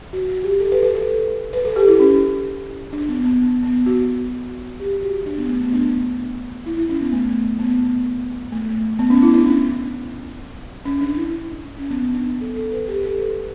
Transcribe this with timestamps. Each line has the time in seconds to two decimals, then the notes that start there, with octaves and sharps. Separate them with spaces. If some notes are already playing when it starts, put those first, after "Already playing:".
0.13 F#4
0.29 F#4
0.44 G4
0.60 A4
0.72 B4
0.83 B4
0.95 A4
1.53 B4
1.65 A4
1.76 G4
1.88 E4
2.00 C#4
2.93 D4
3.09 B3
3.24 B3
3.63 B3
3.86 F#4
4.80 G4
5.03 F#4
5.26 D4
5.38 B3
5.49 A3
5.61 B3
5.73 D4
6.66 E4
6.77 E4
6.90 C#4
7.01 B3
7.13 A3
7.59 B3
8.52 A3
8.99 B3
9.10 C#4
9.22 E4
9.34 D4
9.46 C#4
10.85 C#4
11.01 D4
11.17 E4
11.78 C#4
11.90 B3
12.14 D4
12.41 A4
12.56 A4
12.72 B4
12.88 G4
13.03 A4
13.19 B4